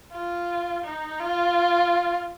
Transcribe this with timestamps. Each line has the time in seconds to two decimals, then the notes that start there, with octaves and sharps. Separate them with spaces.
0.13 F4
0.84 D#4
1.20 F4